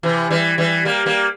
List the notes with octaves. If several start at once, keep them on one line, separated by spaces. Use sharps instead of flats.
C3 E3
E3 G3
E3 G3
G3 A#3
G3 A#3